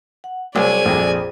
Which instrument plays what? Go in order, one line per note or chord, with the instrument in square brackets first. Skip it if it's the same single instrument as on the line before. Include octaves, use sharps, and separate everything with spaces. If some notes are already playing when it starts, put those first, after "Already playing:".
[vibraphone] F#5
[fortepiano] C2 F#3 [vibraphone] G#4 C5 [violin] D5 G#5
[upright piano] A#1 F2